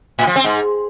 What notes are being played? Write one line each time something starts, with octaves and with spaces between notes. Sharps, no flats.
A2
F3
C4
G#2